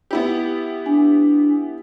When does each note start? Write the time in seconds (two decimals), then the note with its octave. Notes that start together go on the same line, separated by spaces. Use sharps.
0.11 B3 E4 G4
0.86 D4 G#5